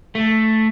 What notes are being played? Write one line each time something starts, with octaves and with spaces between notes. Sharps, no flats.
A3